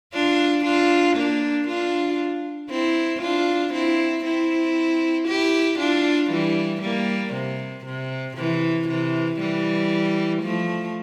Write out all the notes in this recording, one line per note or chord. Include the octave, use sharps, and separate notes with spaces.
D4 F4
D4 F4
A#3 D4
D4 F4
C4 E4
D4 F4
C4 E4
C4 E4
E4 G4
D4 F4
E3 G3
G3 A#3
C3
C3
C3 E3
C3 E3
E3 G3
F3 A3